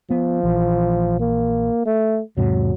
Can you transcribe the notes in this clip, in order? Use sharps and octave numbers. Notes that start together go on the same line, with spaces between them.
F3 B3
A#1 E3
A#3
A3
E2 G#2 C3 F#3